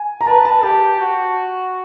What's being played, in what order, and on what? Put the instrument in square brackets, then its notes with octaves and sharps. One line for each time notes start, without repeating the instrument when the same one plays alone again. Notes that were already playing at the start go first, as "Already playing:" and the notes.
Already playing: [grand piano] G#5
A#5
[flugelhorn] B4 [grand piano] A5
[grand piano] A5
[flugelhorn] G4 [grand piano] A5
[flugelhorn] F#4